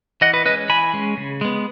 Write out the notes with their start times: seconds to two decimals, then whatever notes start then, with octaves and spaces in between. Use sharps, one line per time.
0.21 E3 D#5 F#5
0.34 B4 D#5
0.46 C#4 B4 D#5
0.49 G#3
0.69 E3 G#5 B5
0.93 G#3 C#4
1.17 C#3
1.41 G#3 B3